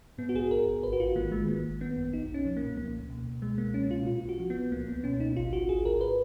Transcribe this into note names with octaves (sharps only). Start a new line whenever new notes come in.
G#2 B3
F#4
A#1 G#4
A#1 A#4
A#1
G#1 B4
F#4
G#2 F4
D#3 A#3
D#3 G#3
G#1 A#3
G#1
G#1 B3
F#2
B1 D#4
B1 C#4
F3
A#3
A#2
C#2 A#3
C#2
B2
C#2
B2 G#3
C#2 A#3
B2 C#4
B2 F4
A#2 F4
B1
F#4
F3
B3
B1
C#2 A#3
C#2 B3
B2 C#4
C#2 D#4
G#1 F4
G#1 F#4
G#1 G#4
G#2 A#4
B4